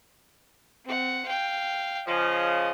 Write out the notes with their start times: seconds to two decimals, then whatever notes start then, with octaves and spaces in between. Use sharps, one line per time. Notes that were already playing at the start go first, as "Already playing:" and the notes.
0.85 C4 F#5
1.25 F5 G5
2.07 C#3 F3 D#5